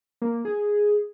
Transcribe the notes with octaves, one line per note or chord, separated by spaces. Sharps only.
A#3
G#4